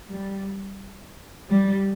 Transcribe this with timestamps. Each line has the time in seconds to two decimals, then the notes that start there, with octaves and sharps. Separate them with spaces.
0.10 G3
1.49 G3